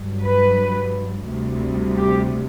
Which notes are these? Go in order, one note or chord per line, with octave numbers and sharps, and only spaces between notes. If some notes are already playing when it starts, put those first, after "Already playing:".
Already playing: G2 F#3
B4
D2 C3 G3
G4